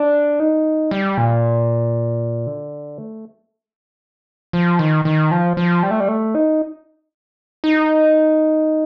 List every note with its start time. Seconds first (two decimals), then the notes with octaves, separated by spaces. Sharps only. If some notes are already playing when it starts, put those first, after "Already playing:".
Already playing: D4
0.40 D#4
0.91 G3
1.18 A#2
2.47 D3
2.98 A3
4.53 F3
4.79 D#3
5.05 D#3
5.31 F3
5.57 F3
5.83 G3
5.91 A3
6.00 G3
6.08 A3
6.35 D#4
7.64 D#4